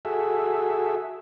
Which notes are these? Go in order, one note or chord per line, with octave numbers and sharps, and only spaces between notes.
F#4 G#4 A4 E5